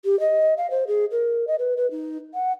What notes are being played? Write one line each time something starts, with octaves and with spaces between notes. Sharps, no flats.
G4
D#5
F5
C5
G#4
A#4
D#5
B4
B4
D#4
F#5